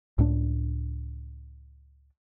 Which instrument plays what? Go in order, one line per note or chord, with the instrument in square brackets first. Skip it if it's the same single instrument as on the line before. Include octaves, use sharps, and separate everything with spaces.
[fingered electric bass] C#2 A2 D4